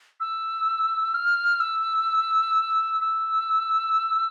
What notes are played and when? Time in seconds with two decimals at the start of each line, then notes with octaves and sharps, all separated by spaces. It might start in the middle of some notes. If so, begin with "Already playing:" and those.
0.20 E6
1.14 F6
1.60 E6
3.01 E6